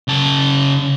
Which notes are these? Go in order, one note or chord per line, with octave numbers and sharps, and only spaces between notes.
C#3 A5